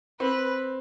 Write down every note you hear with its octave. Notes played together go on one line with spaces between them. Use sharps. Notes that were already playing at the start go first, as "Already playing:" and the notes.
C4 B4